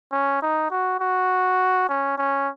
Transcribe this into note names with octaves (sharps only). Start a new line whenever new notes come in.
C#4
D#4
F#4
F#4
C#4
C#4